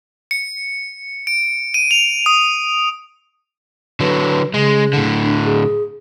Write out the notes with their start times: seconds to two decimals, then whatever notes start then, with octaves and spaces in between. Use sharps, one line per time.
0.31 C#7
1.27 D7
1.74 D#7
1.91 F7
2.26 D#6
4.00 D3 F#3 B4
4.54 C#3 G#3
4.93 A2 D3
5.22 D4
5.45 G#4